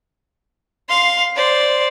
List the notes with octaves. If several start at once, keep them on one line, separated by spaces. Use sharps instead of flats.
F5 C6
C5 D5